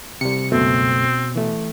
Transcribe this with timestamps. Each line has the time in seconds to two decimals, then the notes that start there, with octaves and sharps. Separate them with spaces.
0.21 C3 G3 C#7
0.52 C#2 F#2 B2 A3 C4
1.36 E3 A3